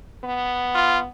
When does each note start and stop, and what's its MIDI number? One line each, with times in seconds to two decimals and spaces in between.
0.24 1.06 59
0.75 0.99 65